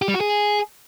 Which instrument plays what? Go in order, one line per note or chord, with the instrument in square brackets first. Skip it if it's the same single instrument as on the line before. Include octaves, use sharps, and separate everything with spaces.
[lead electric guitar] G4
G3
F#4
G#4